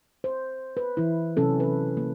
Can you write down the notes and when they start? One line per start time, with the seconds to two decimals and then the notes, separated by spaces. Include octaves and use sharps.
0.24 C5
0.77 B4
0.97 E3 E4
1.37 C3 F#3 C#4 A4
1.60 E3 B4
1.97 A#3